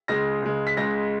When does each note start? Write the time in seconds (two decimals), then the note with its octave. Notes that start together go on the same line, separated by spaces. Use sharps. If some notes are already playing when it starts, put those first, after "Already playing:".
0.08 C#2 C#3 G#3 A#6
0.42 C#2 C#3 G#3
0.67 B6
0.77 C#2 C#3 G#3 A#6